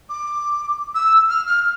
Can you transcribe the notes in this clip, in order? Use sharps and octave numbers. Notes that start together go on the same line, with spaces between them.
D6
E6
F6
F6